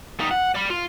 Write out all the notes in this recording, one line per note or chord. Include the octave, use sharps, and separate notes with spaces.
G3 D#4
F#5
D5 B5
F4